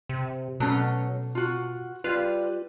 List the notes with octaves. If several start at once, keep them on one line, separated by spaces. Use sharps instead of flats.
C3
B2 F#3 A3 C#4
F4 F#4
G3 F4 B4